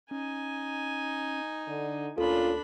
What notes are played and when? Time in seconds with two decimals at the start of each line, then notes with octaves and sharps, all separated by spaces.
0.11 C#4 D#4 G#5
1.68 D3
2.18 D2 A#2 C#4 D4 F4 A4 B5